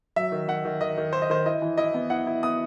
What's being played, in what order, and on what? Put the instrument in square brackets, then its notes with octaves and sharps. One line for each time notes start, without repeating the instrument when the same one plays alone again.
[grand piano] F#3 E5
D#3
D#3 F#5
D#3
D#3 D#5
D#3
D#3 C5
D#5
D#3 C5
E4 D#5
E3
E4 D#5
B3
E4 F#5
E4
B3 D#6